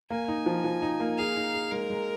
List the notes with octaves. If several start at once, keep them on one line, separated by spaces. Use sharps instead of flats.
A#3 G#5
D#4
F3
F3
D#4
A#3
G#4 F5
D#4
G#4
G#3 A#4
G#3